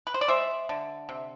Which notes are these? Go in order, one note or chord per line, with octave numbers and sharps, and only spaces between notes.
B4
C5
D5
G#3 C5 E5
D3
C3